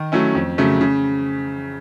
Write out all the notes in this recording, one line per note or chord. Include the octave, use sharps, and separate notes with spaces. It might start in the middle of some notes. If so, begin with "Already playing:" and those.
Already playing: D#3
F#3 A3 C#4 E4
F2
C#3 F#3 A3
C#3